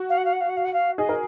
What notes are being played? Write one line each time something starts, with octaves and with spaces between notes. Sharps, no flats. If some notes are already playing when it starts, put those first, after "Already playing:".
Already playing: F#4
F5
F#5
F5
F#5
F5
F#5
F5
F#5
F5
G#4 D#5
A#4